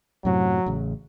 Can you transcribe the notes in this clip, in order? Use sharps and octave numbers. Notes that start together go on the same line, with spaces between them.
F#2 A2 C3 F#3
A1 C#3